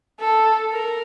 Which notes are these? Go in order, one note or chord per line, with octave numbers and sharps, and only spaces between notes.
A4
A#4